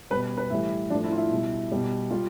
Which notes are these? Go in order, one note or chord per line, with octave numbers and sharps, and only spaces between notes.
B2 G3 B4
B4
A2 E3 G3 E4
A2 F3 D4
E4
F4
E4
B2 G3
B2 G3
G3 F4